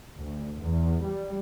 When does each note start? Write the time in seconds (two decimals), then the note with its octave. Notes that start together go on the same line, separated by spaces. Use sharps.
0.19 D2
0.64 E2
1.05 G3